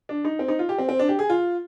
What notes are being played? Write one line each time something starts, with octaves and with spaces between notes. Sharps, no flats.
D4
D#4
C4
D#4
F4
G4
C4
C4
D4
G4
G#4
F4